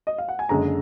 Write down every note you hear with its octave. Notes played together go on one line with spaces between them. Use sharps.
D#5
F5
F#5
G#5
F#1 F#2 D3 G#3 A#5